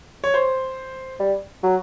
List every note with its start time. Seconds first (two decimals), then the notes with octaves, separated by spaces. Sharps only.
0.24 C#5
0.34 C5
1.20 G3
1.63 F#3